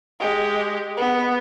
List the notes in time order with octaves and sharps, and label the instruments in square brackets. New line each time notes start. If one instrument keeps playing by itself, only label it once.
[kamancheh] G#3 G4
B3